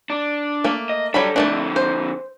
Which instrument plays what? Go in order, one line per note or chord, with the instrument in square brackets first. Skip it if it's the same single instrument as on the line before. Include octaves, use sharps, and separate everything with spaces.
[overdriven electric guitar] D4
[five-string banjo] A3 A#3
[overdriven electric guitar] D#5
[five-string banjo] F#3 G3 B5 [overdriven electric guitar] D4 A4
[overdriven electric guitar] F2 D3 [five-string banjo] A3 A#3 D4
[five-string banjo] C5